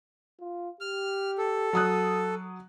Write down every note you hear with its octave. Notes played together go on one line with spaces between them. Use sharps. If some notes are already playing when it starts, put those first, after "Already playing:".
F4
G4 F6
A4
F#3 F#4 D#6 F#6